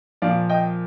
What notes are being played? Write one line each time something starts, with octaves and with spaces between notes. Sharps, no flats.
A#2 F3 D5 F5
D#5 G5